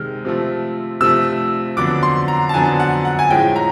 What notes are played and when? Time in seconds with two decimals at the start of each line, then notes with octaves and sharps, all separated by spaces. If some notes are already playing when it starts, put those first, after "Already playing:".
Already playing: C3 D#3 G#3 F6
0.25 C3 F3 A3
1.00 C3 F3 A3 E6
1.77 F2 D3 F#3 B3 D4 D6
2.03 C6
2.28 A#5
2.49 A5
2.54 F2 D3 F#3 B3 D4 G#5
2.80 F#5
3.05 F#5
3.19 G#5
3.30 A2 F3 G#3 C#4 G5
3.56 A#5